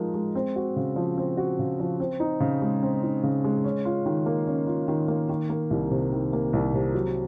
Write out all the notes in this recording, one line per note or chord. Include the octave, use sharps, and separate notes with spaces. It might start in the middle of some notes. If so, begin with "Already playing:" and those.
Already playing: F3 G#3 D#4 A#4
G#3
C4
F#4
C#3
F3
C4
F#4
C#3
F3
C4
D#4
C#3
G#3
C4
D#4
C#3
G#3
C#4
F4
D#3
A#3
C#4
F4
D#3
A#3
D#3
A#3
C2
C3
D#3
A#3
C2
C3
F#3